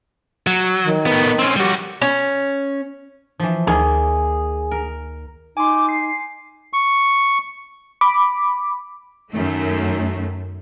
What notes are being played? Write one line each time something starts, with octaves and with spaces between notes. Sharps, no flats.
F#3
D#3
A2 B3
C4 C#4
G3 F#4 G4
C#4
E3 F3
D2 D#3 A#3 G#4
A#4
D#4 G#5 C6 D6
C7
C#6
B5 D6
F#2 D#3 A3